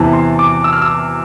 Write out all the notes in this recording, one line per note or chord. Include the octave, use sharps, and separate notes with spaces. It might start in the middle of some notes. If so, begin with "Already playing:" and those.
Already playing: E2 C3 E3 A5
C6
D6
E6
F6
E6